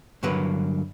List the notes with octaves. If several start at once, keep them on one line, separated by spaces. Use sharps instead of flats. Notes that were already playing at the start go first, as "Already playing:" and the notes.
G2 D3 F#3 A#3 B4